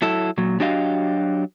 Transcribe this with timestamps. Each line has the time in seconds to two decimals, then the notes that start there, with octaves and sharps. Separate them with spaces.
0.02 F#3 E4 A4
0.38 A#2 F#3
0.60 F#3 D4 F#4 G4 D#5 F5